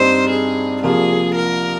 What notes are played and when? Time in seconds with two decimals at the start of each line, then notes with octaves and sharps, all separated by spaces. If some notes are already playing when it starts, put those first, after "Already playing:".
Already playing: G2 G3 C4 D#4 C5
0.30 G#4
0.83 C2 C3 F3 A#3 F4 G#4
1.35 A#4